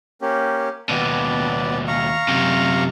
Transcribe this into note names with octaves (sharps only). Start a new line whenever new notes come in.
A#3 C#4 G4
D#2 B2 B3 D5
F5 A#5 C#6
F#2 C3